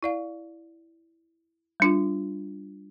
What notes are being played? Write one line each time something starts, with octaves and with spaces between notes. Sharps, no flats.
E4 D5 F5
G3 D4 F4